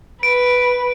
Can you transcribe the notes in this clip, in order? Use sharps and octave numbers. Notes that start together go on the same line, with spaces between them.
B4 D7